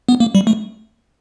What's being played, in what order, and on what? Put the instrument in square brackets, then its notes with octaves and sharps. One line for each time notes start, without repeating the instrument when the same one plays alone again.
[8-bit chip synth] B3
A#3
G3
A3